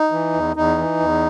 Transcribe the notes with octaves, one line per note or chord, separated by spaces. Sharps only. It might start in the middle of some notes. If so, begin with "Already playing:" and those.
Already playing: D#4
E3
E2
E2 D#4
E3
E2